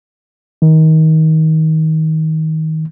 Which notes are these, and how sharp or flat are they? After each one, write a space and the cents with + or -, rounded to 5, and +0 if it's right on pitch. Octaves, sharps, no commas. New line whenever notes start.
D#3 +25